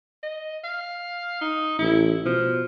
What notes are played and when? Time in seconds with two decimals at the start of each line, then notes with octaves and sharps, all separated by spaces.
0.23 D#5
0.64 F5
1.41 D#4
1.79 A1 E4
2.25 B2 F3